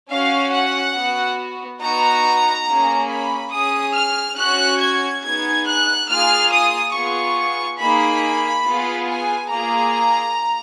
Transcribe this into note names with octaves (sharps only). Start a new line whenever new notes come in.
C#4 F#4 F5
F#5
B3 F#4
B3 D#4 F#4 A#5
A#3 C#4 G#4
B5
C#4 G#4 D#6
F6
C#4 F#4 F#6
G#6
B3 D#4 G#4 G#6
F#6
A#3 F4 G#4 F6
D#6
B3 F4 G#4 C#6
A#3 D#4 G#4 B5
B3 F4 G#4
G#5
A#3 F4 G#4 A#5